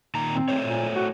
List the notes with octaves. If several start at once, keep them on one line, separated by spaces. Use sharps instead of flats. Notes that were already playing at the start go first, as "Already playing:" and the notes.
A#2 D#3 A#5
C4
A3 C5 C#5
A#2
F#4